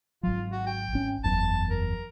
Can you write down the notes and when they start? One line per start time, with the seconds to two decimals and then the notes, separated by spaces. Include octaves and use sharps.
0.23 G#1 F#3 F4
0.52 F#4
0.67 G5
0.93 G#1 C#4
1.24 F#1 E2 F#3 A5
1.70 A#4